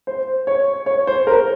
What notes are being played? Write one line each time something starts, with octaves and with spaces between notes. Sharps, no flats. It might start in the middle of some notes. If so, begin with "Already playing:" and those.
C5
C#5
C#5
C5
A#4